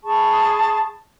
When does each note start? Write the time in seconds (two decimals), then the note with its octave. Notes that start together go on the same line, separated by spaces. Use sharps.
0.04 G#4 A5 B5 C#6